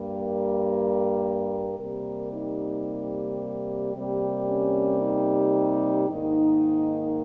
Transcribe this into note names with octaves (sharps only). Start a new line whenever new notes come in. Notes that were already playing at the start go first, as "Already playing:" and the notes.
Already playing: G2 G3 A#3
A#4
C3 G3 A#3 A#4
D#4
C3 G3 A#3
C#4
D#4
G#2 D#3 A#3 D#4